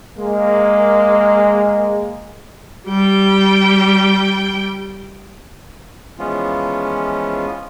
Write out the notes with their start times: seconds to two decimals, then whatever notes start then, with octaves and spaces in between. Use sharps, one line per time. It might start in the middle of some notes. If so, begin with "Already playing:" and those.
0.17 G#3 A#3
2.88 G3 G5
6.18 E3 F3 G#3 B3 C#4 F4